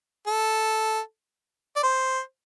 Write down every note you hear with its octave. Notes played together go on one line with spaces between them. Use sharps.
A4
D5
C5